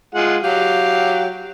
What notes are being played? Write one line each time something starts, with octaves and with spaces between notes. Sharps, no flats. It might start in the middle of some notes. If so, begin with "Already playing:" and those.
G#3 F4 F#5
F#3 G4 F5